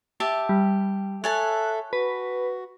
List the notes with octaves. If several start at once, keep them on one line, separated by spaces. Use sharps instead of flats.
G4 E5 A5
G3
A4 C#5 E5 G#5 A5 F#6
F#4 B4